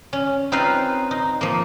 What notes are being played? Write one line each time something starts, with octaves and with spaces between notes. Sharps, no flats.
C#4
C4 D#4 F4 B4 C5 F5
D#4
F3 A#3